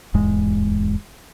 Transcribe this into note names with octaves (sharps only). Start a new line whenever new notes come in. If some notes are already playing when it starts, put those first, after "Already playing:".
D1 E2 G#2 G#3